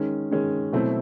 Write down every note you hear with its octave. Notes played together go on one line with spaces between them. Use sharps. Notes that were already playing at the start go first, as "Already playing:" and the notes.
Already playing: D#3 G#3 C#4
D#3 G#3 C#4
B2 F#3 A3 C4 E4